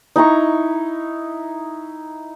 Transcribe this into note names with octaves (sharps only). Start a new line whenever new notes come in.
D#4 E4 A#5 C#6